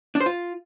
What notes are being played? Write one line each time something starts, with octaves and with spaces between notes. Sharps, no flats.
D4
C5
F4